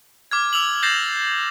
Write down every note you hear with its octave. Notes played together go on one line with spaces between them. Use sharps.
D6 F6 G#6
D6 E6 F7 F#7
G6 A6 A#6 C7 E7